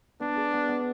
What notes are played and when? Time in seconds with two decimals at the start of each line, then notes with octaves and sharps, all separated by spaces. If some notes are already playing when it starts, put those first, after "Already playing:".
0.20 B3 D4
0.36 G#4
0.53 B3
0.69 B3